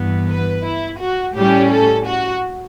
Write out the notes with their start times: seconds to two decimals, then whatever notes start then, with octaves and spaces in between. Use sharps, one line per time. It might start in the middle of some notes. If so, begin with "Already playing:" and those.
Already playing: G2 E3 B3
0.28 B4
0.64 E4
1.00 F#4
1.35 A2 G3 C#4 G4
1.71 A4
2.07 F#4